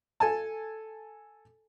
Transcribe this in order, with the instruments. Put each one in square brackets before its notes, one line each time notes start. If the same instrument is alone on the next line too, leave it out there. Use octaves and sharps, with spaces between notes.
[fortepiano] A4 G#5 A5